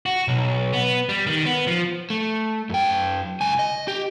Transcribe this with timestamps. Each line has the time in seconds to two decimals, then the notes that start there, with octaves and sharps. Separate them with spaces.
0.06 F#4
0.28 B1
0.73 B3
1.09 G3
1.27 D#3
1.45 B3
1.67 F3
2.10 A3
2.70 F#2 G5
3.41 C#2 G#5
3.59 D#5
3.88 G4